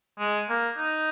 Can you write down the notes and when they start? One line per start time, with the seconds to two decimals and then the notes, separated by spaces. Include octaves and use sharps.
0.19 G#3
0.49 A#3
0.78 D#4